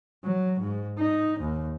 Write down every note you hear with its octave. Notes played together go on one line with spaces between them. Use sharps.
F#3
G#2
D#4
D#2